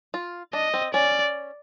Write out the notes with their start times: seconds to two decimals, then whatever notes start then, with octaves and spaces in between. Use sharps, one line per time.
0.14 F4
0.53 D4 D#5
0.74 C4
0.94 C#4 D5